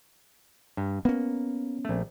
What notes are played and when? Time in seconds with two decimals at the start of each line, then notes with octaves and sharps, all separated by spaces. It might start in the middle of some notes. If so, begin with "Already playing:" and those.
0.77 G2
1.05 A#3 B3 C#4
1.85 A#1 A3